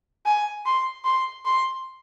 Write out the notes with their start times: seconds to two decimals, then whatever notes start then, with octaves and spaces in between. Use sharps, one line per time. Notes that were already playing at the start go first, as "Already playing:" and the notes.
0.26 G#5
0.66 C6
1.05 C6
1.45 C6